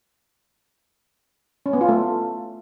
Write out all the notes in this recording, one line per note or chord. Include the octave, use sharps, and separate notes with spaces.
C#4
B3
F4
A3